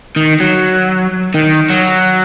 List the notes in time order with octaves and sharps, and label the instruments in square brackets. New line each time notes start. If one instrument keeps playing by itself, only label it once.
[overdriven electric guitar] D#3
F#3
D#3
F#3